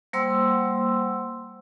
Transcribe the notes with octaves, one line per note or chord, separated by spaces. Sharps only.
G3 A#3 C5 F#5 C6 E6